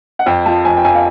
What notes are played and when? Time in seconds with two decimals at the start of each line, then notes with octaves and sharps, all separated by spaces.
0.19 F#5
0.26 F2 G5
0.46 F3 A5
0.65 F2 G#5
0.77 G5
0.84 F2 G#5
0.95 F5